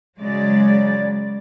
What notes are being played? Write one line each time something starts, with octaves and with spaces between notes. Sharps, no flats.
C#3 F#3 G#3 D5